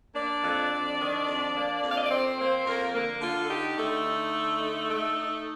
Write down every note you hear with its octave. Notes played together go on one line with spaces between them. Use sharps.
A#3 D4 D5
F2
F2
D#3
F2
A#3
F2
F5
D#5
D5
F2 C4 C5
A#3 C4 C5
F2 A#3 A#4
D3 A#3 A#4
D3 F4
A4
D#4 G4
D3 A3 A4
D#4
D3
D#4
A3
D#4